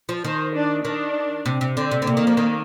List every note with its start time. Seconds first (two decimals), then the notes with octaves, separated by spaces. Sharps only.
0.09 F3
0.24 D#3 C5
0.54 D4
0.85 D#3 D4
1.46 C3
1.61 C3
1.76 D3 C4
1.91 C3
2.02 D3
2.07 C3 A#3
2.17 D#3
2.27 F3
2.37 D#3